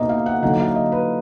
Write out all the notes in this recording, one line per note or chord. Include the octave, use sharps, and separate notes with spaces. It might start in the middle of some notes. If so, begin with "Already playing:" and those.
Already playing: B2 A#3 D#4 D#5
F5
F#5
D3 F#3 A#3 D#4 F#5
F5
D#5
B4